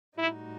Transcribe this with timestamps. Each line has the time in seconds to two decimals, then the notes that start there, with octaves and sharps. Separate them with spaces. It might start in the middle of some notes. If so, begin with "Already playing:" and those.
0.17 A2 G3 D#4 E4 F#4